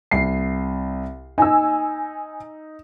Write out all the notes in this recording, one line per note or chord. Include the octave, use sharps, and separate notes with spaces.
C2 C7
D#4 G#5 E6